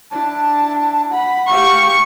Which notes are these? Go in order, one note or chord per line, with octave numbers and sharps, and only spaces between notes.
D4 E4 A5
F#5 B5
G4 F5 C#6